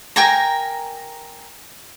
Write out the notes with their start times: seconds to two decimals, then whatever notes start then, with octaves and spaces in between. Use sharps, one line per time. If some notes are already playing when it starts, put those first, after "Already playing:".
0.16 A#4 G5 G#5 A#5